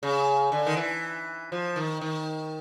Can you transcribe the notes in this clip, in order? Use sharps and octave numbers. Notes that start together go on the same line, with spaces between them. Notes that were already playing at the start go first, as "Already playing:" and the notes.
C#3
D3
D#3
E3
F3
D#3
D#3